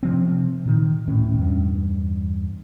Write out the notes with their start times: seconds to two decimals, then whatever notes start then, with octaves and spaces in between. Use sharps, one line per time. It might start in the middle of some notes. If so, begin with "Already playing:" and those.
0.03 C3 F3 C4
0.66 A#2 D#3
1.07 D1 A2 C#4
1.39 E2 G2